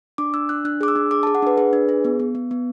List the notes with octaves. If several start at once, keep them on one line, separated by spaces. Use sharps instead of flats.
D4 D6
D4 E6
D4 F#6
D4 F#6
G#4 D6
E6
D4
G#4 D6
A5
G#4
F#5
D4 B4
G#4 B4
D4
G#4
B3
B3
B3
B3